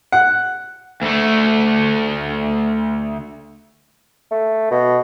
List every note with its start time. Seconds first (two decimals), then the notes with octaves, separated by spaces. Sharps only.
0.12 F#5
1.02 D2 A3
4.31 A3
4.71 B2